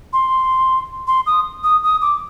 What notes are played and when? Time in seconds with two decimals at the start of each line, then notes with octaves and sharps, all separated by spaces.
0.13 C6
1.07 C6
1.26 D#6
1.64 D#6
1.83 D#6
2.01 D6